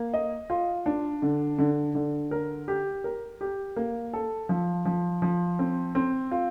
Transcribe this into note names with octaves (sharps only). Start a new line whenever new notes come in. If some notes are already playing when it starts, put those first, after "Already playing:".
Already playing: A#3
D#5
F4
D4
D3
D3
D3
A#4
G4
A#4
G4
A#3
A4
F3
F3
F3
C4
C4
F4